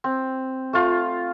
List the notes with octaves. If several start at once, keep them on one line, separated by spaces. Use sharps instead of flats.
C4
A3 F4